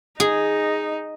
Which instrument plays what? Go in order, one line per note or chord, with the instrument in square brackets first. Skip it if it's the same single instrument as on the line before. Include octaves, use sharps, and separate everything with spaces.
[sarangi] D#4 [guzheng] G#4